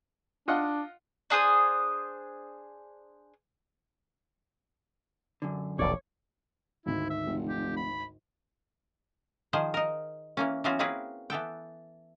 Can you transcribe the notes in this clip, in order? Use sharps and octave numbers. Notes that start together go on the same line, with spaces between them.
D4 F4 D#5 F#5
D4 G#4 C5 D#6
F#2 D3
E1 A#1 A#2 C#5 D5
G#1 D2 G#2 E4
E5
F1
G4
B5
D#3 F3 G#4 C5
D#4 A#4
E3 A#3 C#4
E3 F#3 B3 C#4 F4 F#4
A#3 C4 C#4 E4 G#4 B4
E3 B3 A4 G5